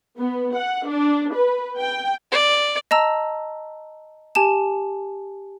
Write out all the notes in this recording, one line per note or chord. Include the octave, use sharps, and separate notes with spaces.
B3
F#5
D4
B4
G5
D5
D#5 A5 A#5 E6
G4 G#5 A5 E7